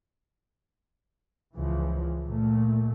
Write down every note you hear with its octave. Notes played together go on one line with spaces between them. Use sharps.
C#2 E3 F3
A#2 A3